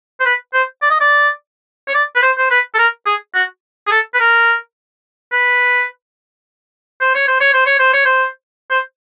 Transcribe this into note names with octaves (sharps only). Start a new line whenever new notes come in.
C5
B4
C5
D5
D#5
D5
C#5
D5
B4
C5
C5
B4
A4
A#4
G#4
F#4
G#4
A4
B4
A#4
B4
C5
C#5
C5
C#5
C5
C#5
C5
C#5
C5
C5